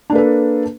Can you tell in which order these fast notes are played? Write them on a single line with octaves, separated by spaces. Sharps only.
D4 A#3 B4 A4